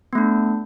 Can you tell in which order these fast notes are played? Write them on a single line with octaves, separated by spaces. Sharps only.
B3 A3 D4